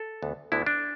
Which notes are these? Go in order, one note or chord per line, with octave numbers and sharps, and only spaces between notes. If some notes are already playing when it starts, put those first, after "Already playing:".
Already playing: A4
D2 D3 B3
D2 D3 B3 E4
D4